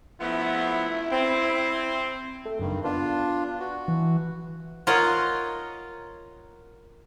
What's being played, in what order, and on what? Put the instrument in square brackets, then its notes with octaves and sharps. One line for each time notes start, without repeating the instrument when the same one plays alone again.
[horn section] F3 A3 B3 [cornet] E4
[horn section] C4
[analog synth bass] A3
[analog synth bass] F#1 [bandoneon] G2 D#3
[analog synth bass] B3 [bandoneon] D4 F4
[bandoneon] F#4
[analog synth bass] E3
[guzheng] F4 A#4 C#5 D#5 F#5